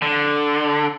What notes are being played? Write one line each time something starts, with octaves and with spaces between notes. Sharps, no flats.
D3